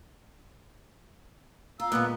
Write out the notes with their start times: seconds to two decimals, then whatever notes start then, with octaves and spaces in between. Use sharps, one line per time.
1.80 F4 F5 A#5 E6
1.92 A#2 D3 G#3 B3